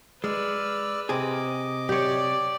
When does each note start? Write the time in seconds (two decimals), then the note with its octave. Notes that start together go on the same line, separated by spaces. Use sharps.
0.24 G#3 B4 D5 E6 F6
1.09 C3 G#4 D#5 D6
1.89 G4 C#5 D5